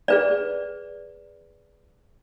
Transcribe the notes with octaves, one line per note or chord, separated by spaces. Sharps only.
G#4 B4 D5